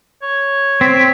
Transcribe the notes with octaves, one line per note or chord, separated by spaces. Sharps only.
C#5
C4 B6